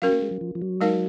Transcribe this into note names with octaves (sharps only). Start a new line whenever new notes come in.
F#3 C#4 F#4 A#4 F5
A#3
G#3
F#3
F3
F3
F#3
G#3 D#4 A#4 F5